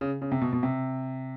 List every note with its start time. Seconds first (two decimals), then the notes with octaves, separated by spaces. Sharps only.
0.01 C#3
0.22 C#3
0.32 C3
0.41 B2
0.53 B2
0.63 C3